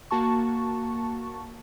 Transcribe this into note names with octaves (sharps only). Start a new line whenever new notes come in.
A#3 F#4 A5 C#6